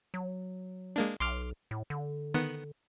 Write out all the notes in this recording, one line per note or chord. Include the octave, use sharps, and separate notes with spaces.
F#3
G#3 A#3 D4
B1 C6 D6 F6
A2
D3
D#3 B3 F#5